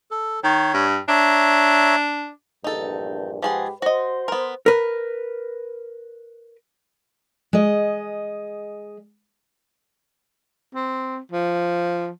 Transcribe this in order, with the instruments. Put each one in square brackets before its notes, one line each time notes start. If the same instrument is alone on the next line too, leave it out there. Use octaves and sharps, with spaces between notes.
[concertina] A4
[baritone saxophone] D#3 [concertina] C#5
[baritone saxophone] G2
[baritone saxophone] D4 [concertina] C#5 E5 A#5
[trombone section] A#1 E2 G2 [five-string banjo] D#4 A4
[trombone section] G#2 G4 B4 [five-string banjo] F3 G#4 F#5
[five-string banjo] F#4 D#5 [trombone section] C5
[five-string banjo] B3 A#4
[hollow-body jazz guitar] A#4 B4
[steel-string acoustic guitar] G#3 D#5
[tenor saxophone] C4
F3